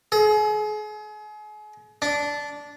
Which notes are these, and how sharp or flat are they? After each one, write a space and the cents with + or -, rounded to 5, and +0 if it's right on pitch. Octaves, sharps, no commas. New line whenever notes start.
G#4 +35
D4 -15